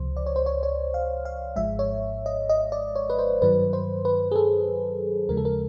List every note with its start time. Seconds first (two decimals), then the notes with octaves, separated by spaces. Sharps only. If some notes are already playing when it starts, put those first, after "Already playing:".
Already playing: C#2 C3 F3 C5
0.17 D5
0.26 C#5
0.36 C5
0.46 C#5
0.63 C#5
0.94 F5
1.25 F5
1.56 G#1 G#2 F3 G#3 E5
1.79 C#5
2.26 D#5
2.49 D#5
2.72 D5
2.95 C#5
3.10 B4
3.19 C5
3.42 G2 D#3 F#3 B4
3.73 C5
4.05 B4
4.31 G#4
4.36 A4
5.29 D#2 C#3 F3 G#3 A#4
5.37 A4
5.45 A#4